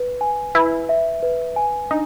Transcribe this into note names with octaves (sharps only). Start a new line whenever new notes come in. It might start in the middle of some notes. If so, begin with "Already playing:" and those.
Already playing: B4
G#5
E4 B4
E5
B4
G#5
D4 D#4